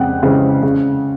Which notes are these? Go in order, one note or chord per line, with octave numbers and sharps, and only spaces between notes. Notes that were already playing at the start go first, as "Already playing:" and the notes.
Already playing: F2 C#3 G#3 F#5 G5 F#6
C#3 E3 G#3 C4
C#3